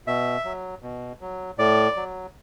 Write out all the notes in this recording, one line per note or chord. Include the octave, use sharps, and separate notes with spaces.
B2 E5
F#3
B2
F#3
A2 D5
F#3